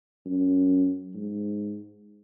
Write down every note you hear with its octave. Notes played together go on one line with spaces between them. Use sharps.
F#2
G#2